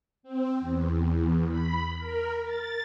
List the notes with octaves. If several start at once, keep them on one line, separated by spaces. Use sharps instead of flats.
C4
E2
B5
A#4
A6